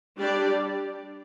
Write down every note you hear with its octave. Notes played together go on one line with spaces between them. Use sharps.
G3 D4 G4 D5